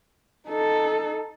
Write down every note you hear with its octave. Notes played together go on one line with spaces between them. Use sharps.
D#4 A4